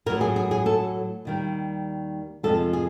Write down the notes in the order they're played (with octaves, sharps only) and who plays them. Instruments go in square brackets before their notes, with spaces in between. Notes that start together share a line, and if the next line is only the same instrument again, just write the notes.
[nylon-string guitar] A2 A#4
F#3
G#4
G#4
G#4
A4
D#2 D#3 G3
F2 C3 F3 G#3 A4
G#4